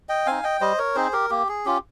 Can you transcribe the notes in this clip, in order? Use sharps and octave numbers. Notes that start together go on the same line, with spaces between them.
D#5 G5
C4 D#4 F5 G#5
D#5 G5
G3 C5 D#5
A#4 C#5
C4 D#4 G#4 C5
G4 A#4
A#3 G4
G#4
C#4 F4 G4